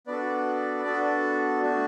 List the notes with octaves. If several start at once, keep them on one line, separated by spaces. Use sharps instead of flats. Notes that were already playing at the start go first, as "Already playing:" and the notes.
B3 D4 F#4 A4 B4 D5
B3 D4 F#4 A4
A3 D4 F#4